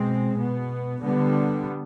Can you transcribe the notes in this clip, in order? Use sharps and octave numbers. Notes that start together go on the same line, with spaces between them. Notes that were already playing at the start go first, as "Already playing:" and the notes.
Already playing: B2 G#3 C4
B2 B3
D3 G3 B3